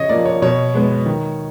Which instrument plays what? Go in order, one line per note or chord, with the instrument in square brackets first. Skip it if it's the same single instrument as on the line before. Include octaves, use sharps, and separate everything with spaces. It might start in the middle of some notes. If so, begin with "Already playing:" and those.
Already playing: [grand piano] C#3 C#5 D#5
F3 A#3 D5
C#5
B2 C#5
G#3 B3
D#3